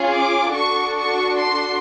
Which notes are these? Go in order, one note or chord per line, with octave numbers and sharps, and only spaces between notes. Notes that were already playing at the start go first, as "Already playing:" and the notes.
Already playing: C#4 F4 G#4
D6
D4 F#4 A4 C#6
C#6
C6